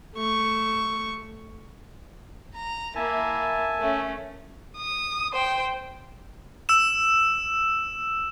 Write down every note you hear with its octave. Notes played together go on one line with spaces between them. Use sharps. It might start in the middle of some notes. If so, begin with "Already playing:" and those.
A3 C#6
A#5
A#3 E4 E5 G#5 A5
A3 C#4
D#6
C5 G5
E6 E7